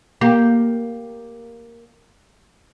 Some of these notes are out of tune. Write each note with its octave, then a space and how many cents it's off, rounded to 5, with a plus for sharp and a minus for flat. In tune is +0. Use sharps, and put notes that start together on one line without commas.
A#3 +0 G4 +0